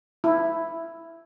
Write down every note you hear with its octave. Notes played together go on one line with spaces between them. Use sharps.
E4